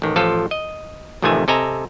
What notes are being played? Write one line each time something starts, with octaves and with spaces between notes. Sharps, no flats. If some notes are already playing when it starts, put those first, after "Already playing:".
A1 D#3
A1 F3 F4 A4
D#5
A1 F2 C3 D#3 A3 G#5
C3 A4 D#5 G#5 A#5